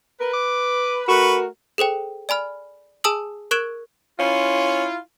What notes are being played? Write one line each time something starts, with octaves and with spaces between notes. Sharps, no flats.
A#4 B4
D6
A3 F#4 A#4 B4 C#6
G#4 A4 C5 G5
D5 G#5 B5 F6
G#4 G#5 A5 D#6 E6 F#7
A#4 C#6 F#6 G#6 D7 E7
C#4 E4 F4